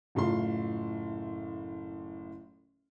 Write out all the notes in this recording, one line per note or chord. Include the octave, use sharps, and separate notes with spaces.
F#1 A2 F4 C6